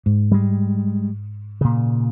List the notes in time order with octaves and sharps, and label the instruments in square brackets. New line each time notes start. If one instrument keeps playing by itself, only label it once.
[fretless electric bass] G#2
[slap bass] G3 G#3
A#2 C#3